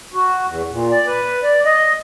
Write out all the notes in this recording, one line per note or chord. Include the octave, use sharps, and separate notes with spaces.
F#4
E2
A#2
D5
B4
D5
D#5